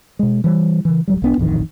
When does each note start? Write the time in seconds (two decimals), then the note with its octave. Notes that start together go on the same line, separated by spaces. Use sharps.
0.19 B2 G#3
0.44 E3 G3
0.85 C#3 E3
1.08 D1 F#3 G3
1.22 B1 B3 D4
1.38 D#1 A1 F2 D#3